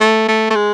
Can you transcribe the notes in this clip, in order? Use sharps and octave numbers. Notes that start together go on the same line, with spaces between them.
A3
A3
A3
G#3